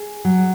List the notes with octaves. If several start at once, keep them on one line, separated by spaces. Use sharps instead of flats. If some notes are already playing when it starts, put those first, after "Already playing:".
Already playing: G#4
F#3